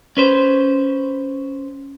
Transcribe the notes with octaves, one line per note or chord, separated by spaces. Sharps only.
C#4 B4 C5